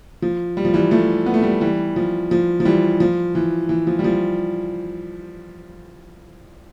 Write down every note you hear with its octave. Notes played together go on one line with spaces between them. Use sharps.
F3
G3
F3
E3 G3
F3 A3
B3
A3
G3 B3
E3 G3
F3
F3
F3
E3 G3
F3
E3
E3
F3
G3
F3